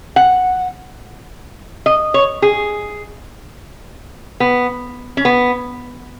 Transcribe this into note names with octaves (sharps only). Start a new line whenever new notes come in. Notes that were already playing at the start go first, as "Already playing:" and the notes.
F#5
D#5
C#5
G#4
B3
C#4
B3